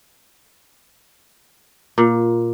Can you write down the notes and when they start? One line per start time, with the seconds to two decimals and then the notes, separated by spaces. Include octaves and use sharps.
1.98 A#2